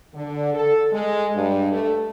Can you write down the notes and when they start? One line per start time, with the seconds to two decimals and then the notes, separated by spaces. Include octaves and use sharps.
0.15 D3
0.54 A4
0.93 G#3
1.35 G2
1.72 A3